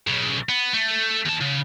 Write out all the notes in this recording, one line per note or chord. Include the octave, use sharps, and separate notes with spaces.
B1 C#3
B3
A3
D#2 A5
C#3